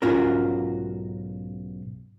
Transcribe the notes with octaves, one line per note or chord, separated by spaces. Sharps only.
B1 G#2 C#4 F4 F#4 A#4